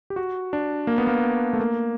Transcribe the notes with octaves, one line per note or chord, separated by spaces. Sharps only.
G4
F#4
D4
A#3
B3
A#3
A3
A#3